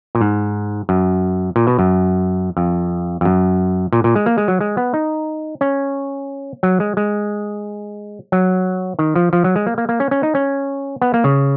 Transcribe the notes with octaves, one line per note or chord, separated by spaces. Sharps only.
A#2
G#2
F#2
A#2
B2
F#2
F2
F2
F#2
A#2
A#2
G#3
A#3
G#3
F#3
G#3
B3
D#4
C#4
F#3
G#3
G#3
F#3
D#3
F3
F3
F#3
G#3
A#3
A#3
A#3
C#4
C#4
D#4
C#4
B3
A#3
C#3